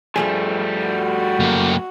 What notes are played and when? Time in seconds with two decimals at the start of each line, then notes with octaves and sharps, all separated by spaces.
0.16 G2 F3 G3 A3 G#4
0.87 F#4
1.40 F#2 A#3